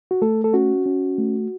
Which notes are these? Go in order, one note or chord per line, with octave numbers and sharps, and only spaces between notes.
F#4
A3 A4
A4
C#4 F#4
C#4
A3